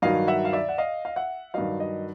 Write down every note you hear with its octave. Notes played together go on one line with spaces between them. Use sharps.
G2 D#3 F#3 D#5 F5
E5 F#5
F5
D5 E5
F#5
D#5 F5
F5
E5 F#5
G2 D#3 F#3 D#5 F5
D#5